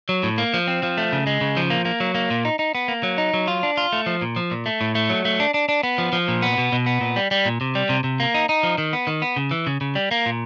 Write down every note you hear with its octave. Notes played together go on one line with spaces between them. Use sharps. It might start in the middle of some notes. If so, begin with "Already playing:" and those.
F#3
A2
A#3
F3
C4
F3
A3
C#3
G#3
C#3
F3
A#3
A#3
F#3
A#3
A#2
D#4
D#4
B3
A#3
F#3
D#4
F#3
F4
D4
F4
A3
F3
A#2
F3
A#2
A3
A2
A3
F#3
A3
D4
D4
D4
B3
F3
F3
A#2
B3
B2
B2
B3
A#2
G3
G3
A#2
C3
G3
C3
C3
A#3
D#4
D#4
F3
D#3
B3
D#3
B3
C#3
E3
C#3
C#3
G3
A#3
A#2